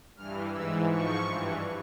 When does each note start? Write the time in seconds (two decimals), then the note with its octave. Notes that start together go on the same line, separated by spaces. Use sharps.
0.16 G2 E3 F6
0.52 G#2 E3 E6
0.88 G#2 F3 C#6
1.25 G2 E3